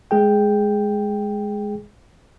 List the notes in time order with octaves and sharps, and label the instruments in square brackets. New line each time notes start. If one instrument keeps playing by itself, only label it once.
[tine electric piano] G#3 G#4 G5